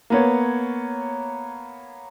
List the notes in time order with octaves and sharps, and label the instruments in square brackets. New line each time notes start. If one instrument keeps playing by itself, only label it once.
[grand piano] A#3 B3 C#5